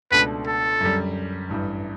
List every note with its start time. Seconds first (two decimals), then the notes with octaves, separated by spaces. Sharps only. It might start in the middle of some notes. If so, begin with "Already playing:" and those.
0.11 C#2 B2 A3 D4 B4
0.47 A4
0.80 F#2 D3 G3
1.50 A1 G2 E3 G3